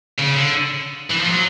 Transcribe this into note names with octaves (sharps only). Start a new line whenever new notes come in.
C#3
D3
E3
F3
F#3